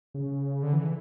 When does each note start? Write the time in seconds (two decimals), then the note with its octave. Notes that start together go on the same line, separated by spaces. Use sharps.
0.14 C#3
0.63 D3
0.73 E3